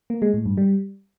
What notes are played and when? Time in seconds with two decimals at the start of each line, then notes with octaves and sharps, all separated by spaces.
0.10 A#3
0.22 G#3
0.34 A2
0.46 G2
0.57 G3